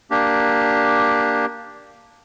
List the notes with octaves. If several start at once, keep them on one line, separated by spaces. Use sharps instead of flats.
A#3 D4 G4